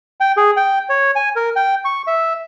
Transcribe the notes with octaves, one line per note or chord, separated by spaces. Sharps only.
G5
G#4
G5
C#5
G#5
A#4
G5
C#6
E5